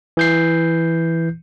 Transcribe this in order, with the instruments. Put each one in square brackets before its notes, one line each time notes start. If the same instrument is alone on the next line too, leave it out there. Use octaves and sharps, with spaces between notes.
[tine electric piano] E3 G6 C7